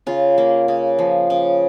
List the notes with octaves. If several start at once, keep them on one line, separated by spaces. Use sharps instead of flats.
C#3 F4
A#3
C#3
F3
C#3